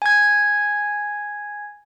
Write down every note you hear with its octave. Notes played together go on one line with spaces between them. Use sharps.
G#5 G#6